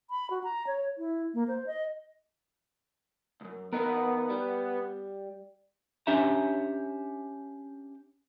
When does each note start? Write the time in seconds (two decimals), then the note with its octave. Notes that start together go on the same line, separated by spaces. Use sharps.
0.10 B5
0.30 F#4
0.44 A#5
0.67 C#5
0.98 E4
1.34 A#3
1.48 C5
1.66 D#5
3.41 C#2 F#2
3.73 E2 B3 D#4 A#4
4.30 G3
6.07 C#4 D4 G4 C#5 E5 A#5